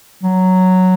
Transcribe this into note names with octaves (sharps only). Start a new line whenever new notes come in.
F#3